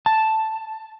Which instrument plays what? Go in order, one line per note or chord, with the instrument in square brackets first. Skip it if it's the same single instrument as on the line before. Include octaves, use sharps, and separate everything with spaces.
[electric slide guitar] A5